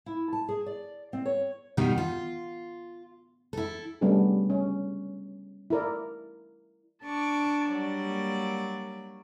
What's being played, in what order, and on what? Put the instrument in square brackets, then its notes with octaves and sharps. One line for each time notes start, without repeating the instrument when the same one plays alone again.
[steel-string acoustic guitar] E4
A5
G#4
D5
C4
C#5
B2 D#3 G3 D#4
F4
E4 A4
[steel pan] G3 A3 B3 C#4 D4 G#4
C#4
E4 A#4 D5
[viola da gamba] D4 [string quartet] A5 C#6 D6
[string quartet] F#3 G3 D5
[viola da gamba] A#3